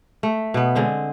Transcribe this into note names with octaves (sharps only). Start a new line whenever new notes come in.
A3
B2 B3
D3 G#3 C4